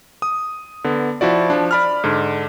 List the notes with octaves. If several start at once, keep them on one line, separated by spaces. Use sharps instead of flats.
D#6
D3 B3
F3 E4 F#4 D5
F3 D4
D5 B5 F6
G#2 D3